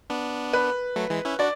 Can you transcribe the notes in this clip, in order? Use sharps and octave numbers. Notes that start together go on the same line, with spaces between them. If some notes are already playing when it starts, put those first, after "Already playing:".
B3 D4
B4
F#3 A3
E3 G#3
C#4 E4
D4 F#4 D5